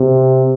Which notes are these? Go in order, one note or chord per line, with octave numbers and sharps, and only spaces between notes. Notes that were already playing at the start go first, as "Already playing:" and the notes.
Already playing: C3